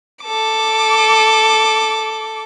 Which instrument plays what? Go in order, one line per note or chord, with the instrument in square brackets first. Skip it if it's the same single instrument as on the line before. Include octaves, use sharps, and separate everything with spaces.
[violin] A4 D6